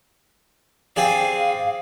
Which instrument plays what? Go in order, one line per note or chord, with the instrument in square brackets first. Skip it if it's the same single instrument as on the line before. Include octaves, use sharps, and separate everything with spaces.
[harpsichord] C4 G#4 D5 [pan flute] F5